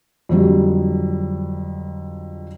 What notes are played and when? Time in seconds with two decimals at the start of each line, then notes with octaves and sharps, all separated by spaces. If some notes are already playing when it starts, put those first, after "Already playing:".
0.29 F2 D3 F#3 G3